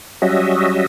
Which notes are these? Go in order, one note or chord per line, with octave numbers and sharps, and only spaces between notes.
F#3 G3 C#4 F#4 D#5 E5